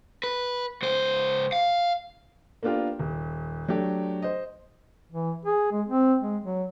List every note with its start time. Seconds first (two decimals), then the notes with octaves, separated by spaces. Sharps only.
0.24 B4
0.82 C#2 C5
1.53 F5
2.63 A#3 B3 D4 F4 G4 A#4
2.99 D#1
3.68 F#3 A3 D4 G4
4.22 C5 D#5
5.12 E3
5.45 G#4
5.71 G#3
5.88 C4
6.22 G#3
6.44 F#3